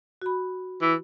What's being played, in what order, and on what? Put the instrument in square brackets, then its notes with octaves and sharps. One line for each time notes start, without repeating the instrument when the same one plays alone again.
[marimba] F#4 B5
[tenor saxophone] E3